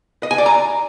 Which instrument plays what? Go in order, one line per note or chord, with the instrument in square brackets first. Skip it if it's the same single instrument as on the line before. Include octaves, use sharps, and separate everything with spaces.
[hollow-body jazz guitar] D#5
G#5
D5
A#5